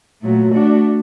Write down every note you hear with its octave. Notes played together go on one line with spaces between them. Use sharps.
A#2 F#3 A3
A3 D4 F#4